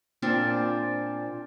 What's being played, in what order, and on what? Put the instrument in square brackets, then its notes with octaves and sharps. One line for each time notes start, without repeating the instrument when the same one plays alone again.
[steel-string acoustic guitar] A#2 C4 D4 F4 C5 G5